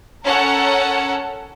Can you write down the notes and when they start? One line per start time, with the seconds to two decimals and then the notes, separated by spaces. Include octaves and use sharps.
0.24 C#4 A4 A#4 C#5 F#5 A5